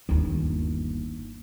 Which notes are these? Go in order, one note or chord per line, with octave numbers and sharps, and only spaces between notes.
G1 D#2